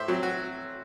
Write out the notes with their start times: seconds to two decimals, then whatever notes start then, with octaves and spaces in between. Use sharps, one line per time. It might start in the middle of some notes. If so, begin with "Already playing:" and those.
Already playing: A2 C5 E5
0.08 F#3 C4
0.23 F#4